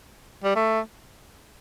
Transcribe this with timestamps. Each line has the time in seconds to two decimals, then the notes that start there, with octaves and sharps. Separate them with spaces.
0.44 G3
0.56 A3